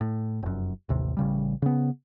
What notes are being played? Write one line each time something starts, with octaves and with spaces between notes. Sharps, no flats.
A2
F1 F#2
A1 D#2 C3
A1 C#3 G3
C#3 B3